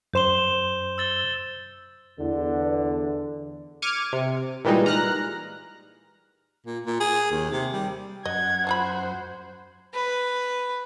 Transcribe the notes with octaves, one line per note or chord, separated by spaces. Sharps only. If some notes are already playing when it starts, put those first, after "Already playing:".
F#2 C5 C6 G6 E7 G7
E6 A6 G7
E2 D3
D6 F6 G#6 C#7 D#7
C3
A#2 E3 G3 G#3 D#4
A#5 F6 F#6 A#6
A#2
A#2
G#4
D#2
C3
G3
F#2 D#5 F#5 G#6
F3 F4 C5 B5
B4